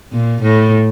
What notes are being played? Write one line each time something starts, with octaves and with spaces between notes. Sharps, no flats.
A#2
A2